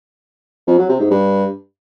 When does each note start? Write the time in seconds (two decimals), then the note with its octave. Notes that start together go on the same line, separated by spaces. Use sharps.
0.67 F2
0.78 F#3
0.89 C3
1.00 G#2
1.10 G2